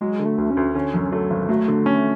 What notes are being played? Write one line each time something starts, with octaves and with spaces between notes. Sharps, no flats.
F#3 G#3
D3
A3
D2
C#4
D2
D3 C#4
F#2
F#3 A3
G#1
F#3 A3
D3
C#4